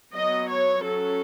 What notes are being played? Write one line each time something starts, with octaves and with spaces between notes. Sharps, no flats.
F#3 B3 D#5
C#5
F#3 C#4 A4